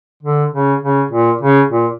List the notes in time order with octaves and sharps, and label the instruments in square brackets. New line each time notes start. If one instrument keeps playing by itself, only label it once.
[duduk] D3
C#3
C#3
A#2
C#3
A#2